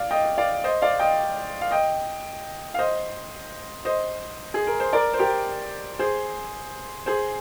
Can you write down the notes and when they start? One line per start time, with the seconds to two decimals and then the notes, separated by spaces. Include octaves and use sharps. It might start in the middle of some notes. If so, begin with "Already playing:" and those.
Already playing: D5 F5
0.10 D#5 G5
0.38 D5 F5
0.64 C5 D#5
0.82 D5 F5
0.99 D#5 G5
1.61 F5
1.71 D#5 G5
2.74 F5
2.79 C5 D#5
3.85 C5 D#5
4.54 G#4
4.67 A#4
4.80 C5
4.93 A#4 D5
5.14 C5
5.19 G4 A#4
5.99 G#4 C5
7.06 G#4 C5